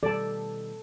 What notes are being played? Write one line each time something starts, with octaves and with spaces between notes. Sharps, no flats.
B2 D#3 G3 A4 D5 A5